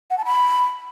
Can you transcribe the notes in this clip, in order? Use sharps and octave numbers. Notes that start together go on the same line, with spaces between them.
F#5
A5
B5